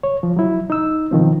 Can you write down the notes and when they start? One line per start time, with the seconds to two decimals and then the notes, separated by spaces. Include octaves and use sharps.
0.03 C#5
0.23 F3
0.36 F#3 E4
0.70 D#4 E6
1.11 B2 D#3 F3 C4